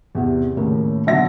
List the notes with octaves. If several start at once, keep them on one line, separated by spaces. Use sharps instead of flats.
E2 C3
D#2 A2 C#3 A#3
B2 D3 F#3 E5 A#6